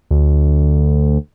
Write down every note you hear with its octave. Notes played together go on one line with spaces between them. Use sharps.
D2